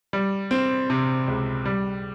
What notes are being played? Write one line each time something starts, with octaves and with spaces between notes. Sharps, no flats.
G3
C4
C3
C#2
G3